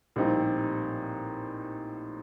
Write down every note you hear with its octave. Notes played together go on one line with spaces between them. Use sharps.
A#1 A2 G3 C4 D#4